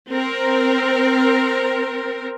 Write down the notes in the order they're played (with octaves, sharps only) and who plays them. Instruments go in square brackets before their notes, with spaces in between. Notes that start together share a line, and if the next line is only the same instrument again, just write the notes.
[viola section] C4 A#4